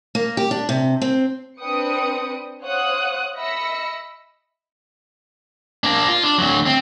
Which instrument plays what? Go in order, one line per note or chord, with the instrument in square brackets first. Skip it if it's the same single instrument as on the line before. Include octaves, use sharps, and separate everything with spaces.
[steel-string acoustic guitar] A#3
G4
D4
C3
C4
[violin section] C4 D4 B4 G5 D#6 C#7
C5 C#5 F5 F#5 D#6 F#6
D#5 E5 B5 E6 A#6 C#7
[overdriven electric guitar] A#3 D4
F4
D4
D2 F#3
C4